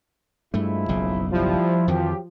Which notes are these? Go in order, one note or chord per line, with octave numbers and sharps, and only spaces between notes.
G2 F3 G#3 A3 E4
F#1 B1 C#3
F3 G3 E4
F2 D#3 E3 F#3 G4